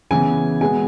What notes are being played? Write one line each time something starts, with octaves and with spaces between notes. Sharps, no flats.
C#3 E3 B3 G#5
B2 G#3 B3 G#5